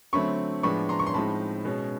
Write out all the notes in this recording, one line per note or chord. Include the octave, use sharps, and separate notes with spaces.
D3 F#3 A3 C4 B5 C#6
A2 F3 G#3 B3 D4 B5 C#6
A#5 C6
C#6
C6
A2 F3 G#3 C4 D#4 A5 B5
B2 G#3 C#4